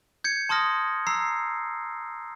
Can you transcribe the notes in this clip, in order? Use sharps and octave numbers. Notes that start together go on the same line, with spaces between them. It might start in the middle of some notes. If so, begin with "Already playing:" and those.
G6 G#6 C#7
A5 C6 D#6 F6 A#6
A#5 E6 C7